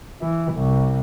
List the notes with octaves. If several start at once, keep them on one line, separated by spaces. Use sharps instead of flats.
E3
C2